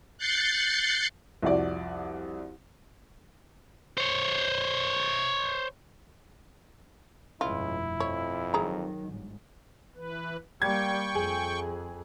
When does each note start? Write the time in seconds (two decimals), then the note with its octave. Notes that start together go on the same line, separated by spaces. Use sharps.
0.18 F#6 G6 A6 C7 C#7
1.43 C2 F2 F#4 D5
3.98 C5 C#5
7.41 F1 C#2 G2 B2 E4 F4
8.00 F2 C#5
8.54 D#3 F#3 G#4 A#5
9.09 G1 G#2
9.96 E3 B4
10.62 G3 A#3 G5 C#6 G#6
11.15 F2 G#4